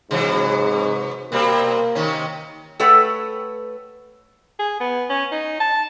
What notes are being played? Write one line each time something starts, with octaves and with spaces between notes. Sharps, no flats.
G#2 C3 E3 F#3
B2 G3 A#3 C4
C3 D#3 C#4
A3 A4 B4 C#5 F#5 G5
G#4
B3
C#4
D#4
A5